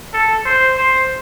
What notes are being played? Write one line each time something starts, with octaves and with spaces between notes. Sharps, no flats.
A4
C5
C5